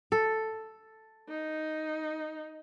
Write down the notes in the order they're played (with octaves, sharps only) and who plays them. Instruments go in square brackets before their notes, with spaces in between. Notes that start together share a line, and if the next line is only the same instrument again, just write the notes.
[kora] A4
[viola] D#4